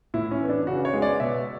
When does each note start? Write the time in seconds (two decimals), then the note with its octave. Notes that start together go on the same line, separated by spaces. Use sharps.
0.14 A2 E4
0.31 C#4
0.40 E3 B3
0.49 D4
0.67 C#3 F#4
0.85 C#5
0.94 G#3 B3
1.02 D5
1.20 B2 E5